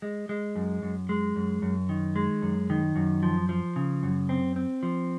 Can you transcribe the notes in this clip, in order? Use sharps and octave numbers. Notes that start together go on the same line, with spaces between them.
G#3
G#3
F#2
F#2
G#3
F#2
F#2
D#3
G#3
F#2
D#3
F#2
F3
F3
C#3
F#2
C4
C4
F3